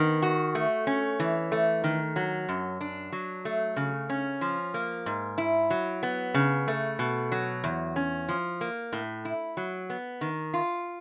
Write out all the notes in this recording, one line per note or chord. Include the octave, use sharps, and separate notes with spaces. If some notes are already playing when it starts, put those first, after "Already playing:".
Already playing: D#3 B3
F#4
A3
C#4
E3
A3
D#3
F#3
F#2
D4
F#3
A3
C#3
C#4
F3
A#3
G#2
E4
F#3
B3
C#3
A3
B2
F#3
E2
C#4
F3
A#3
A2
E4
F#3
B3
D#3
F4